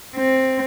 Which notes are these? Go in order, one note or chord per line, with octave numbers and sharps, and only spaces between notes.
C4